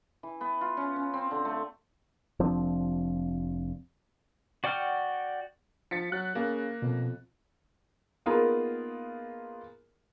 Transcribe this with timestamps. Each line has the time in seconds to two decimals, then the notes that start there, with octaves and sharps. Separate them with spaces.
0.23 E3
0.41 B3
0.61 F4
0.77 C#4
0.96 C#4
1.14 C4
1.31 D3
1.45 A3
2.40 F1 F3 C4 D4
4.64 F#4 D5 F#5 G5 F6
5.91 F3 A6 B6 C#7
6.12 F#3 F#6
6.35 C#3 A#3
6.82 F2 B2
8.26 A#3 B3 D#4 F4 G#4 A#4